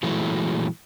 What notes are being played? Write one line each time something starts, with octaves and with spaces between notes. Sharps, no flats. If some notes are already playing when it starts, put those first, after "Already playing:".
A#2 E3 F#3 G#3 A3